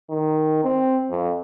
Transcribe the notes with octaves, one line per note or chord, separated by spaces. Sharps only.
D#3
C4
F2